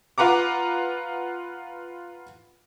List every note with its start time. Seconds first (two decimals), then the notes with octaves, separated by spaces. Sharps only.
0.18 F4 B4 F#5 A#5 D6